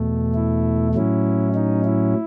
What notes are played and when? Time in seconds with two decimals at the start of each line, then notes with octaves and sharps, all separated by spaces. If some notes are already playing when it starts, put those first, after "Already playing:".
Already playing: E2 B2 A3
0.35 E4
0.95 A2 F#3 C#4 E4
1.55 D#4
1.85 E4